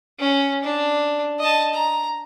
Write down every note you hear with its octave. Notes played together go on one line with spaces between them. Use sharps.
C#4
D4
D#5 A5
A#5